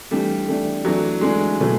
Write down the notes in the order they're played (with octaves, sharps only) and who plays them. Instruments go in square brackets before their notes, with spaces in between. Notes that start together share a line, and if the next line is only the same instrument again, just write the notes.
[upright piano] E3 A3 D4 [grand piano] G3
[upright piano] E3 A3 D4
[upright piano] E3 A3 D4 [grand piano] F#3
[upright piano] E3 A3 D4 [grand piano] G#3
[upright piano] B2 F#3 A3